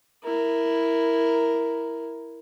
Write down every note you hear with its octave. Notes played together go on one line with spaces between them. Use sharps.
E4 A#4